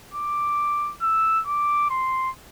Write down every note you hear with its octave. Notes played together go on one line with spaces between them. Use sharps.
D6
E6
D6
C6